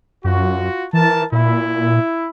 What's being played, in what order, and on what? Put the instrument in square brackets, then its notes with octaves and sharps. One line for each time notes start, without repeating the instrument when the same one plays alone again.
[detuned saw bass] F#2 [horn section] F4 F#4
[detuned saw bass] E3 [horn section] A#4 A5
[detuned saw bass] A#2 [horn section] E4